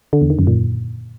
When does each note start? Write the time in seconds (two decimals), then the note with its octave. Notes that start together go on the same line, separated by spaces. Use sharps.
0.13 D3
0.21 E2
0.30 D#3
0.39 F#2
0.47 A#2